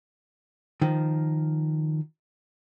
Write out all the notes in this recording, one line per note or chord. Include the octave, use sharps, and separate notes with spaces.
D#3 F3